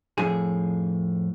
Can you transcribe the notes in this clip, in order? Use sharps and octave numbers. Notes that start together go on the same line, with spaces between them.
F2 A2 G#4